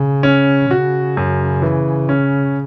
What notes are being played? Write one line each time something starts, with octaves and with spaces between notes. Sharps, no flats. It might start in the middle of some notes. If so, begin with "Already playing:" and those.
Already playing: C#3
C#4
C#3 F#4
F#2
E3
C#4